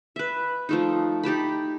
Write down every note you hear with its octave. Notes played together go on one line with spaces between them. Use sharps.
B4 E5
F3 A3 D#4
D#4 G4 A5 B5